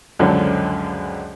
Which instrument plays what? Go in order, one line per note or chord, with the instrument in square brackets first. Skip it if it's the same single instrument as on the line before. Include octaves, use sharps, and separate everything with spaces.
[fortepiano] C#2 F#2 D3 F3 F#3